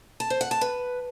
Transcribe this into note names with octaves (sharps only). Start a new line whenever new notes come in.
A5
C5
F#5
A5
B4